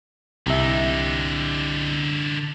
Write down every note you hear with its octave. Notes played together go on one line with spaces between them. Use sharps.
C2 D3 D#4 E5